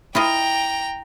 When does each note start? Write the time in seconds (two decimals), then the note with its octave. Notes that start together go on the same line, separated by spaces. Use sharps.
0.15 E4 F4 D#5 G5 A#5